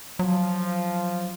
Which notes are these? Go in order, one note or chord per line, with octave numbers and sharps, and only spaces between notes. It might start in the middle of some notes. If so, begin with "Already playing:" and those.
F3 F#3